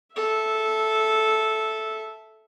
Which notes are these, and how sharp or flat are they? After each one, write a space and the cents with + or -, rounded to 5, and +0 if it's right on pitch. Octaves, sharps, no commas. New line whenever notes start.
A4 -10 E5 +0